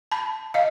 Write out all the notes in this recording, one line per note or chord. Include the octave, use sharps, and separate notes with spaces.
A5 B5
D#5 F5